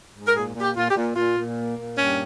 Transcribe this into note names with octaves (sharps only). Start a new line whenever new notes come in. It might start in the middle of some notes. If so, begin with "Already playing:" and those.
G#2
A#4
A#2 G#4
A#2
G4
A#2 F4
G4
A#2
A#2 F4
A#2
A#3
A#2
G2 C#4